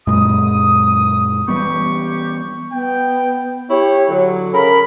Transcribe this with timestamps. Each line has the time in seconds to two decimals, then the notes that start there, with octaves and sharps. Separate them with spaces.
0.07 F#2 A#2 G#3 D#6
1.48 E3 G3 B3 G4 C#6
2.73 B3 G5
3.70 E4 G4 C#5
4.09 D3 F#3
4.54 C#3 A#4 B5